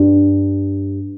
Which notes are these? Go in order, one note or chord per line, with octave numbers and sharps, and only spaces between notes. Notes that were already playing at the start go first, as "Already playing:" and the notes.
Already playing: G2